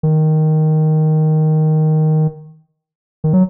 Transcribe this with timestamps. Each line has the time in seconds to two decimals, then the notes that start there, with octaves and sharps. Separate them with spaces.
0.03 D#3
3.24 D#3
3.33 F#3